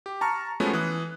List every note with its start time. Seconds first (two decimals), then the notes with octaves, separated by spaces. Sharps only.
0.06 G4
0.21 A5 A#5 C#6 F6
0.60 F3 G#3 A3 B3 C#4 F#4
0.73 E3 D#6 F#6